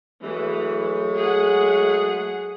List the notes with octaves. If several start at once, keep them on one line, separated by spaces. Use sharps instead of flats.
E3 F#3 G#3 A3
G#4 F#5